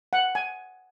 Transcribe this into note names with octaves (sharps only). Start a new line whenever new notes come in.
F#5
G#5